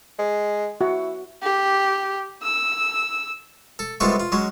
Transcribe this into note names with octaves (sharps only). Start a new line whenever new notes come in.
G#3
E4 F#4
G4
E6
A4
C2 G#3 B3 F4 A4 C#6
F4
F#3 G#3 C#4